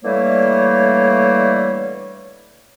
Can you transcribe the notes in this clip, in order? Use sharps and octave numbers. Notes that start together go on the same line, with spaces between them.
D3 E3 G3 A3 A#3 C#5